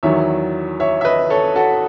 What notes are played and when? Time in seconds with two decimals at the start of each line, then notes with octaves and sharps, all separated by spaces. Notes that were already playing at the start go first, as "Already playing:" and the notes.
0.03 E2 D#3 F#3 C#5 E5
0.80 C#5 E5
1.01 E5
1.04 B4 D#5
1.30 A4 C#5
1.55 F#4 A4